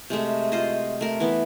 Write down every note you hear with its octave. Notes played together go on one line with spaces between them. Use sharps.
C3 G#3 A3
F4 C5 D#5
A3 A#4
E3 B3